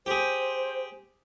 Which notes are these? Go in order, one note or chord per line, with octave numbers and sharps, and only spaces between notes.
G4 G#4 C5